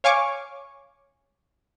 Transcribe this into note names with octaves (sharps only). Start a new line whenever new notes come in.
C#5 F5 G#5 C#6 D6